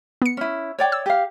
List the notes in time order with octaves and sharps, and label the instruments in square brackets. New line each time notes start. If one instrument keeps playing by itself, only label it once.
[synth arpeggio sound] B3 C#7
[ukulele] C#4 E4
C#5 D5 G5
[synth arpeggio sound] E6
[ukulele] G4 F5